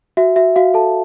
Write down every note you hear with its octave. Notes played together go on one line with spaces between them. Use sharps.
F#4 E5
F#4 E5
F#4 F5
A4 A5